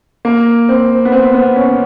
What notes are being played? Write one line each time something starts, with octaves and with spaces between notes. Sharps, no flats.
A#3
C4
B3
C4
B3
C#4